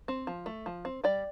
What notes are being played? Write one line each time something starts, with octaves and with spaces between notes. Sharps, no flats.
C4
F3
A3
F3
C4
G3 D5 G5